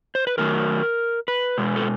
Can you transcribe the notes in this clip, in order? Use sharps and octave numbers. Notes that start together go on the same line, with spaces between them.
C5
B4
D#3 F#3 A3 A#4
B4
B2 G#3
A4